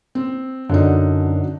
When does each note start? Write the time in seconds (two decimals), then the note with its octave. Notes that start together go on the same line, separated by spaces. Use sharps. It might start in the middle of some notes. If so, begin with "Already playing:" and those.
0.15 C4
0.69 F#2 D3 D4 D#4